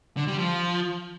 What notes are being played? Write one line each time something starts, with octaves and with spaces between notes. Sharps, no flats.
D3
G3
F3